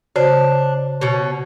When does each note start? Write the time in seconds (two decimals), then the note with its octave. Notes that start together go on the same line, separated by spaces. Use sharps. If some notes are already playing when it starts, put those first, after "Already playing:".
0.16 C#3 D4 F#4 C5
1.01 B2 C#4